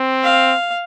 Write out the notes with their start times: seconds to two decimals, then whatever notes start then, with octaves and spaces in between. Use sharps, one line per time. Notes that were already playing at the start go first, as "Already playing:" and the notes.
Already playing: C4
0.23 F5